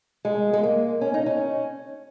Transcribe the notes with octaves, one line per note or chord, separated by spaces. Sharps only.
G#3
G#3
A#3
C#4
D#4
C#4